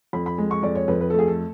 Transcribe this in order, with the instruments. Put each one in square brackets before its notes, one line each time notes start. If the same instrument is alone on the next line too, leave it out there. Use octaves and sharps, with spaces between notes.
[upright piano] F2 B5
B5
G#3
C#6
F2 D5
C#5
F2 B4
B4
A3 A4
G#4
A4